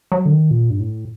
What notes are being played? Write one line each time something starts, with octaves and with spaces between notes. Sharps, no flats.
F#3
D3
D#3
A#2
G2
A2